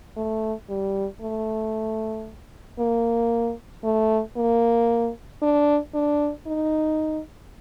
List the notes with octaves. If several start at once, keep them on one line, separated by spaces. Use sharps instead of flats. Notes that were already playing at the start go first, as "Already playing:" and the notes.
A3
G3
A3
A#3
A3
A#3
D4
D4
D#4